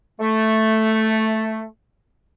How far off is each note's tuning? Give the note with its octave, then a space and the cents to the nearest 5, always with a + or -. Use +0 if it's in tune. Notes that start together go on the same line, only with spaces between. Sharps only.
A3 +0